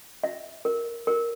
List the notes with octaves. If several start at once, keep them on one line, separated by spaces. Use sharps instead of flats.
E5
A#4
A#4